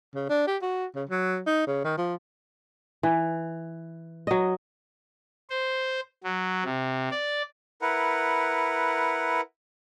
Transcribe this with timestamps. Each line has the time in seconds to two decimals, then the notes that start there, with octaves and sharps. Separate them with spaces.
0.15 C#3
0.30 D4
0.47 G4
0.62 F#4
0.95 C#3
1.09 F#3
1.46 D#4
1.67 C#3
1.84 D#3
1.98 F3
3.03 E3
4.27 F#3 D#5
5.50 C5
6.24 F#3
6.64 C3
7.11 D5
7.82 E4 A#4 B4 F#5